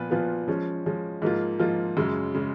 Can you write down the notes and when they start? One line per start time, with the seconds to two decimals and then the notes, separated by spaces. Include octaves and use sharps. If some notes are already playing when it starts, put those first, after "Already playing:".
Already playing: A#2 F3 B3 F4 B4
0.11 A#2 F3 B3 F4 B4
0.48 F3 G#3 C#4
0.85 F3 G#3 C#4
1.22 G#2 F3 A#3 F4
1.59 G#2 F3 A#3 F4
1.97 F#2 C#3 G#3
2.34 C#3 G#3